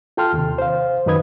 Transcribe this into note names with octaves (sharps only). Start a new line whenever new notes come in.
F4 A4 G5 A5 C6 F6
D#2 C3
C5 F5
F#2 D#3 D#4 B4 D#6 G#6